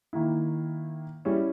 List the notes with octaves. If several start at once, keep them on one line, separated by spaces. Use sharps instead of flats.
D#3 A#3 E4
G3 C#4 E4